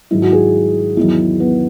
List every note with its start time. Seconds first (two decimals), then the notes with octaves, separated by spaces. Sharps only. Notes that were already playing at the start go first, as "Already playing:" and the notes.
0.11 G#2 D#3 F#3 E4
0.22 F#4
0.32 G#4
0.97 E2 D#3 F#3 E4
1.40 B3